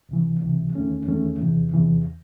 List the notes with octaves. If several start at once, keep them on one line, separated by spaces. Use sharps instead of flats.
C#2 C3 E3
C#2 C3 E3
E2 D#3 A3 C#4
E2 D#3 A3 C#4
E2 C3 E3
E2 C3 E3